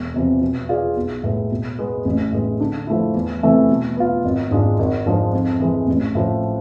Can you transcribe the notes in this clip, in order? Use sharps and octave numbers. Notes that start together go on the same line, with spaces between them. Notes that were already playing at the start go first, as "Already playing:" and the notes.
Already playing: E1
E2 C3 F3
B2
B3 F4 G#4 D5
B1
A2 G#3 B3
B2
G#3 B3
A1
A2 G#3 B3
D3
F3 A3 E4
E2
C3 E3 A3 E4
B2
B3 F4
G#1
G#2 G#3 D4 F4
G#1
G#2 F3 G#3 D4
F2
E3 G#3
A1
A2 F3